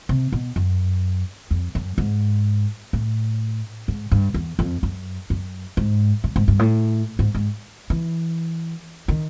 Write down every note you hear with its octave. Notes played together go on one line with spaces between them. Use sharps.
C3
B2
F#2
F2
F#2
G#2
A2
G#2
G2
E2
F2
F#2
F#2
G#2
A2
G#2
G2
A2
G#2
G#2
E3
D#3